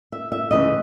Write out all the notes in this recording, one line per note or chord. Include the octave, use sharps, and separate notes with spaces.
E5
E5
D2 C#3 E3 D#5